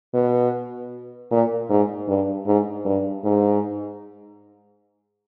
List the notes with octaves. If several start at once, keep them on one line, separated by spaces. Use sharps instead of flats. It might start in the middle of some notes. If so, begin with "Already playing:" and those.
B2
A#2
G#2
G2
G#2
G2
G#2